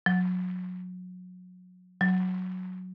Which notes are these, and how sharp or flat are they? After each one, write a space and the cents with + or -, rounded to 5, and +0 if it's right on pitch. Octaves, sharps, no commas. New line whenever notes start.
F#3 -25
F#3 -5